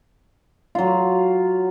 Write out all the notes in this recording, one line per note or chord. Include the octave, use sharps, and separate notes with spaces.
F#3 F4